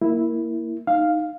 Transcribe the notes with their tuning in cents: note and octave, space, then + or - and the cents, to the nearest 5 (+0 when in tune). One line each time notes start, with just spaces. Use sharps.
A#3 +0 E4 -5
D#4 +0 F5 +0